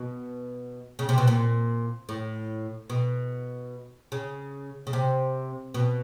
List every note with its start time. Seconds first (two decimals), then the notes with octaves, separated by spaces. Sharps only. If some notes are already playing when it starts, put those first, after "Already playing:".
Already playing: B2
0.99 C#3
1.09 C3
1.18 B2
1.27 A#2
2.09 A2
2.90 B2
4.12 C#3
4.87 C#3
4.93 C3
5.74 B2